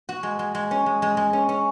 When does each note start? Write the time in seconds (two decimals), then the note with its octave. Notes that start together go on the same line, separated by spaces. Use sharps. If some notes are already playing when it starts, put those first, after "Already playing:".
0.09 F#4
0.23 G#3
0.39 G#3
0.55 G#3
0.71 C#4
0.86 G#3
1.02 G#3
1.17 G#3
1.33 C#4
1.49 C#4